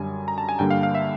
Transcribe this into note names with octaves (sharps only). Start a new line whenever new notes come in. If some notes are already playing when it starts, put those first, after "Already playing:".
Already playing: F#2 D3 G3 G#5
A#5
A5
G#5
G2 D3 G3 A#3 G5
F5
F5
E5